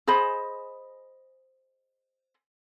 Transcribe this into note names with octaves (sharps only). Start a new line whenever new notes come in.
G#4 C5 D#5 B5